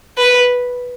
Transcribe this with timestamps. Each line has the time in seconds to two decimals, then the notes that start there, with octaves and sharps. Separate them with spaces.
0.18 B4